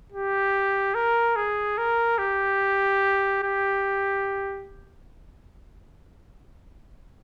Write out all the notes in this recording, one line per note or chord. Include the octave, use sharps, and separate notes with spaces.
G4
A#4
G#4
A#4
G4
G4